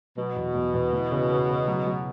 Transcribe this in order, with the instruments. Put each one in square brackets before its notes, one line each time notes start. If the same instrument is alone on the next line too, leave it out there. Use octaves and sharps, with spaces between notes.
[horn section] B2 [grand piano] F#3
[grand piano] E2
E2
E2
E3
C#3
C#3
C#3
F#3
F#3